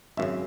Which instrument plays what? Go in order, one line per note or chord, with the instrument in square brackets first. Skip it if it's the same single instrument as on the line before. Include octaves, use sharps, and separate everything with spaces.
[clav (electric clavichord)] G#1 F#2 C#3 [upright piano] E5